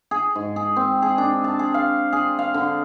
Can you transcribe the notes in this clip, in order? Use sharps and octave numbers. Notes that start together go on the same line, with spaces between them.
G#4
G#2
G#4
C4
G#4
D4
A5
G#4
F5
G#4
F5
D3